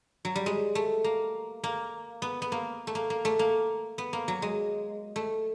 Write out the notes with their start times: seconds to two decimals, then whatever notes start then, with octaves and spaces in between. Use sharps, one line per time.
0.25 F#3
0.35 G3
0.46 G#3
0.75 A3
1.04 A#3
1.64 A#3
2.22 B3
2.42 B3
2.52 A#3
2.87 A3
2.95 A#3
3.10 A#3
3.25 A3
3.39 A#3
3.98 B3
4.13 A#3
4.28 F#3
4.42 G#3
5.16 A3